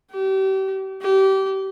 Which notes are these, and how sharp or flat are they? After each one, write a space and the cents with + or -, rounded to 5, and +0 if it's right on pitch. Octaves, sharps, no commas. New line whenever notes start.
G4 -35
G4 -25